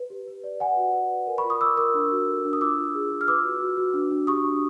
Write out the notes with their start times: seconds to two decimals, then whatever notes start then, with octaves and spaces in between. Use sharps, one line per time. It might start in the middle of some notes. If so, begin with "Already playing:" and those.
Already playing: B4
0.10 G4
0.27 B4
0.44 D5
0.60 B4 F#5 G#5
0.77 F#4
0.93 B4
1.11 D5
1.27 A#4
1.38 B5 C#6
1.44 F4
1.50 C#6 D#6
1.61 F4 D6 E6
1.77 A#4 D6 E6
1.94 D4
2.11 F#4
2.27 A4
2.45 D4
2.53 D#6
2.61 F4 D6 E6
2.78 F4
2.95 G#4
3.11 F4
3.21 F6
3.28 B4 D6 E6
3.44 F#4
3.61 F#4
3.77 F#4
3.94 D4
4.11 D4
4.27 G4 C#6 D#6
4.44 D4